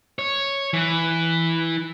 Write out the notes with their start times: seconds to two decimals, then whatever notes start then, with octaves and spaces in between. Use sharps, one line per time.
0.19 C#5
0.73 E3